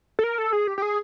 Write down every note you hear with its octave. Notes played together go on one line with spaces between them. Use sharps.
A4
A#4
A4
G#4
G4
G4
G#4